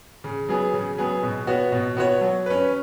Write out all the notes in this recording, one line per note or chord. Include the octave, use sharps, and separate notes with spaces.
C#3
F#3 B3 G#4
C#3
F#3 B3 G#4
B2
B3 F#4 C#5
B2
B3 F#4 C#5
F#3
C#4 B4